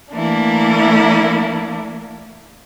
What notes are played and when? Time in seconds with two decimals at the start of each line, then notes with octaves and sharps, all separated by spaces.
0.13 E3 A3 A#3 D4 E4